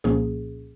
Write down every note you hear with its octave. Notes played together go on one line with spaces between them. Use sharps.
C2 A#2 F3 A#3 C#4 G#4